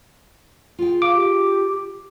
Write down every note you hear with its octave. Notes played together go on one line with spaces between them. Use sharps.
F4 G#4 G5
F5 D6
G4